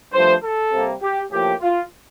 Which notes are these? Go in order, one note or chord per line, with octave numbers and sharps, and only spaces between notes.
G2 F3 A3 C5
A4
C3 G3 A#3
G4
A2 F3 A#3 G4
F4